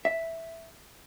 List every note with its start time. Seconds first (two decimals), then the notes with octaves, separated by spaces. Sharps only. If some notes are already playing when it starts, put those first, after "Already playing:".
0.05 E5